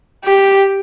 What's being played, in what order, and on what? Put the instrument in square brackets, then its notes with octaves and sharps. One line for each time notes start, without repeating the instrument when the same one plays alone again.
[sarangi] G4